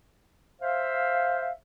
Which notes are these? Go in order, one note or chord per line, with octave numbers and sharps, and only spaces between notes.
C5 E5 F5